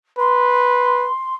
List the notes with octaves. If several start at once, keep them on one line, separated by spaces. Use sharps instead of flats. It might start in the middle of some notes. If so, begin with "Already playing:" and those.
B4 C6